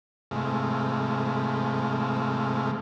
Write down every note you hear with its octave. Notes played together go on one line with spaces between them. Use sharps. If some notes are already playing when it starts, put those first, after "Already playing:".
G#2 C3 E3 G#3 A3 F5